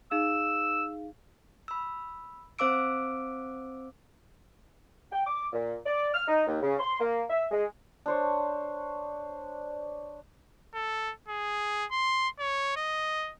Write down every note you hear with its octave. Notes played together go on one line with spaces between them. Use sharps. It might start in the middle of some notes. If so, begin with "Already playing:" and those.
D#4 G#4 F5 E6
B5 E6
C4 C5 F5 D6 E6 D7
G5
D6
A#2
D5
F6
D#4
D#2
C#3
C6
A#3
E5
G#3
D4 C5 C#5
A4
G#4
C6
C#5
D#5